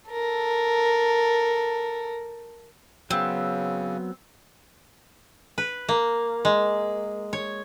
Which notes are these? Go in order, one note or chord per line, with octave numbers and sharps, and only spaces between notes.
A4 A#4
C#3 F#3 B3 C4
B4
A#3
G#3
C#5